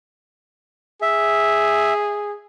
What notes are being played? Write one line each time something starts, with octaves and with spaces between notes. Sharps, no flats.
G#4 E5